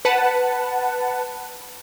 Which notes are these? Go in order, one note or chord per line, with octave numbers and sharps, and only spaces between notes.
B4 F#5 A5